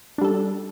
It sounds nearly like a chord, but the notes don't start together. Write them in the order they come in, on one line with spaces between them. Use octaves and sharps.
D4 G3 A4